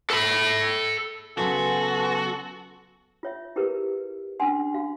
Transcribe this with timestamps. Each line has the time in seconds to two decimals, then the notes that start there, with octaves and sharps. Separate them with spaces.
0.10 A4 B5
1.38 C#3 F#3 B3 F#4 A4 B4 G#5 C6
3.23 F4 C#5 E5
3.56 E4 G4 G#4 A#4 B4
4.40 C#4 D4 F#5 G#5 C6
4.74 F#4 F5